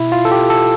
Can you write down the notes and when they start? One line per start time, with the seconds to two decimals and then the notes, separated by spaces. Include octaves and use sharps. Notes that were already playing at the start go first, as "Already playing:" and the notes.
Already playing: B2 E4
0.12 F4
0.25 A4
0.31 G4
0.50 A4